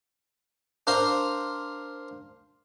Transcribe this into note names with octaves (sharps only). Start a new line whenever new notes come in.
D4 A#4 C5 F5 C6